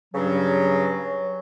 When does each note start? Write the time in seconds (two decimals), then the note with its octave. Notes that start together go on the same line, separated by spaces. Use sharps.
0.14 G2 C#3 F#3